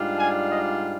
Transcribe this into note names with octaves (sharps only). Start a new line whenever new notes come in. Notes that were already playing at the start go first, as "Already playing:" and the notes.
Already playing: G#2 G3 D4 F4
G#5
D#5